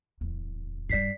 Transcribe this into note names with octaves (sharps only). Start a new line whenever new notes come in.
D1 E2
G2 G3 D5 B6 C7